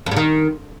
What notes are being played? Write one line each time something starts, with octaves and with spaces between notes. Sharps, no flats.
F2
G2
D#3